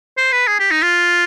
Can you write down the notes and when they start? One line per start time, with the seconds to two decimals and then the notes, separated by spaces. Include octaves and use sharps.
0.17 C5
0.32 B4
0.47 G#4
0.59 G4
0.71 D#4
0.82 F4